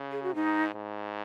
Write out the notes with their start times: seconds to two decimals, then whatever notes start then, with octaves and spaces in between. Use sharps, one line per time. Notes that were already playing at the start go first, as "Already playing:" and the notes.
Already playing: C#3
0.12 G#4
0.23 F#4
0.34 G#2 D#4
0.75 G#2